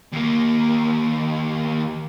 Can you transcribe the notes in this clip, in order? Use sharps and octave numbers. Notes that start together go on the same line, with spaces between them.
D#2 A#3